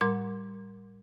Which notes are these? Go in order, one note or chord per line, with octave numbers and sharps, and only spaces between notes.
A2 G3 A#4 C6 D6